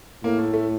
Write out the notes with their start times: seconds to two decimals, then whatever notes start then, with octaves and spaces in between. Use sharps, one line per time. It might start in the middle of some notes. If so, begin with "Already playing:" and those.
0.23 A2 A#3
0.39 A3
0.53 A3